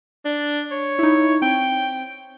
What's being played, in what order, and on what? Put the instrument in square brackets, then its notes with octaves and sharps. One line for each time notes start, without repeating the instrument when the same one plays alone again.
[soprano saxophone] D4
C#5
[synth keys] D#4 E4
[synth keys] C4 [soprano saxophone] G5